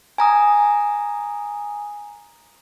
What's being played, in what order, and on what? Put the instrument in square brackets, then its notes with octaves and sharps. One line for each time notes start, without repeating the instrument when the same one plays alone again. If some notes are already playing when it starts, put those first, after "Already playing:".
[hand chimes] G#5 A#5 D#6